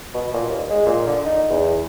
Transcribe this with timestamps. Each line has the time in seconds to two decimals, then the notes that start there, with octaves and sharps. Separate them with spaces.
0.14 B2
0.34 A#2
0.49 D#2
0.70 G#3
0.86 A#2
1.07 D3
1.25 D#4
1.50 E2